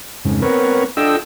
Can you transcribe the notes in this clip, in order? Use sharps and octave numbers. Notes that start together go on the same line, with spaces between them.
F2 G#2 C#3
B3 C4 A#4 B4 C#5
D4 F4 A4 D#5 G5 E6